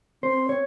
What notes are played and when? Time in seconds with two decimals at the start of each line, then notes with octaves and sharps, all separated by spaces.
0.23 C4 C5
0.49 C#5